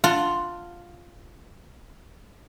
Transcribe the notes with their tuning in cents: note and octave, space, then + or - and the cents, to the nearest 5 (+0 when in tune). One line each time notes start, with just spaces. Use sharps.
F4 +0 F#5 +0 A5 +20